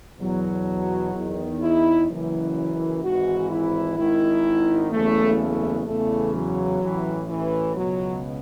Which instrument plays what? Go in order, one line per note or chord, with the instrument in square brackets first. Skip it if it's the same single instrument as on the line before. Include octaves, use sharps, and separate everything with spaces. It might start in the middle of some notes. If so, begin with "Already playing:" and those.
[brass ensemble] E2 B2 F#3
E2 D#3
E4
F#1 F#2 E3
G#1 G#2 E3 F#4
E4
G#1 G#2 D#3 E4
F#1 E2 C#3 E3 A3
A3
E2 C#3 E3 A3
F#3
A1 A2 E3
E3
C#2 B2 F#3